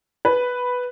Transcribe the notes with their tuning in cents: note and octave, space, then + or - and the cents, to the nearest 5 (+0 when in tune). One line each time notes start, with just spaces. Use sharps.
B4 +0